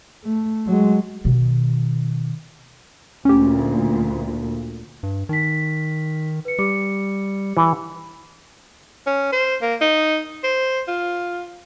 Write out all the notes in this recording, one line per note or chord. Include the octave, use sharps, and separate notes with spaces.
A3
F#3 G#3
B2 D#3
D2 A#2 C#4 G4
G2
D#3 D#4 B6
B4 C#7
G3 G4 D6 C#7
E3
C#4
C5
A#3
D#4
C5
F4